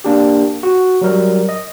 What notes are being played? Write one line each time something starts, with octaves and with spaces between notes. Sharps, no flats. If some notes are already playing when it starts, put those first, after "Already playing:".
A#3 D4 G4
F#4
F#3 G3 A#4
D#5